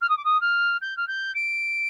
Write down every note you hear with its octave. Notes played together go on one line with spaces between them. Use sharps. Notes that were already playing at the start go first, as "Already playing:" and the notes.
F6
D#6
D6
D#6
F6
G6
F6
G6
D7